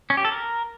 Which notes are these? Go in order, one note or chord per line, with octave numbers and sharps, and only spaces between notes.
C#4
G4
A4
A#4